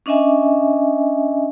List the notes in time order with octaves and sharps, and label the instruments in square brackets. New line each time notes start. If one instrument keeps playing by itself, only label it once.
[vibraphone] C#4 D4 D#5 E5 G#5